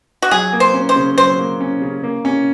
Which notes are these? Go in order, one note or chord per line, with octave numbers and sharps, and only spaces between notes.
F#4
F#3 G#4
A#3
C5
C#4
C5
C#3
F#3 C5
A#3
C#4
C#3
A#3
C#4